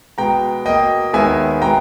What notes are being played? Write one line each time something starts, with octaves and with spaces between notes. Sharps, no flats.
B2 G#3 B3 G5 A#5
B2 A#3 D#5 G5
D#2 D#3 G#3 B3 E5 G#5
B2 G#3 B3 G5 A#5